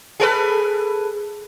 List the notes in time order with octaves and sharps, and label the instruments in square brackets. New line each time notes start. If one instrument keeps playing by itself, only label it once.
[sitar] G#4 A4 B4